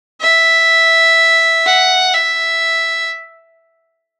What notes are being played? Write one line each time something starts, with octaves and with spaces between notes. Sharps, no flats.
E5
F#5
E5